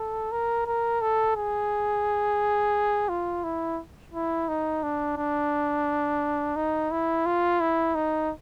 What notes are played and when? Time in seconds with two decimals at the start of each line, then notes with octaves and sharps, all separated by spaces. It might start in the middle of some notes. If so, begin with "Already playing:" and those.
Already playing: A4
0.32 A#4
0.66 A#4
1.01 A4
1.36 G#4
3.09 F4
3.44 E4
4.14 E4
4.48 D#4
4.83 D4
5.17 D4
6.56 D#4
6.91 E4
7.25 F4
7.60 E4
7.95 D#4